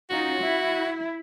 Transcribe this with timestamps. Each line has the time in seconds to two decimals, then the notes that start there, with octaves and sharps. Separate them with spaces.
0.10 C#4 D#4 F4 F#4
0.40 E4